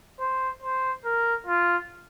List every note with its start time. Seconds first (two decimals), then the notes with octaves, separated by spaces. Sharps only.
0.21 C5
0.63 C5
1.05 A#4
1.47 F4